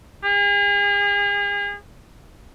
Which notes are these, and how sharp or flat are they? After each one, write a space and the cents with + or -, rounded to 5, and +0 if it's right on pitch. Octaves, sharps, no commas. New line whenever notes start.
G#4 -40